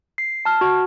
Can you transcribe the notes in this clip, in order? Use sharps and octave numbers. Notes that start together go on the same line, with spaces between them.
C7
A5 F6
F#4